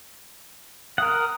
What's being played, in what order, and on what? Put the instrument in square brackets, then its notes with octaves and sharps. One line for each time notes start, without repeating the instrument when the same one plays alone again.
[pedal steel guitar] A#4 F#5 [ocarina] D#6